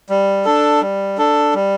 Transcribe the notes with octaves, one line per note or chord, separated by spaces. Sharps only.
G3
D4 A4
G3
D4 A4
G3